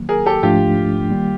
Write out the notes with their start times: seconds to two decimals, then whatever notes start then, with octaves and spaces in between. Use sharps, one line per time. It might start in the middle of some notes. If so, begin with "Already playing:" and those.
Already playing: D#3 F#3 A#3
0.09 G#4 A#4
0.26 G4 A4
0.43 G#2 F3 A3 D4 F4 G4
1.10 D#3 G3 A#3